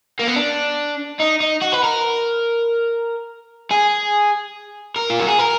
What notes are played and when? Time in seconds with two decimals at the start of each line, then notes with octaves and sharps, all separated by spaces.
0.19 A#3
0.27 B3
0.36 D4
1.20 D#4
1.40 D#4
1.61 F#4
1.72 B4
1.83 A#4
3.71 G#4
4.96 A#4
5.10 F4
5.19 F#4
5.28 G#4
5.39 A#4